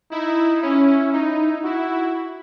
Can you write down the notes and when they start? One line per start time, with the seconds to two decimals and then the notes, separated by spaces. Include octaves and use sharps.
0.11 D#4 E4
0.62 C#4 E4
1.13 D#4 E4
1.64 E4 F#4